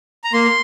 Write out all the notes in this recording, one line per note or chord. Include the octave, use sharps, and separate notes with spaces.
A#5
A#3 C6